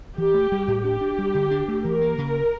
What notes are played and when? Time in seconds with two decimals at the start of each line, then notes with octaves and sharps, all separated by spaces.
0.18 E3 G4
0.34 A3
0.52 G3
0.68 A2
0.84 D4 G4
1.01 D4
1.18 G3
1.35 D3
1.51 D4
1.68 A3
1.84 E3 A#4
2.02 A#3
2.18 C#3